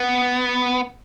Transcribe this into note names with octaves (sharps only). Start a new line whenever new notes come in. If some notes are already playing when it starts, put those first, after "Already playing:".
Already playing: B3